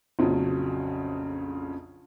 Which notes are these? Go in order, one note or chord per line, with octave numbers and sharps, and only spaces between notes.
A#1 F2 C#3 F#3 C#4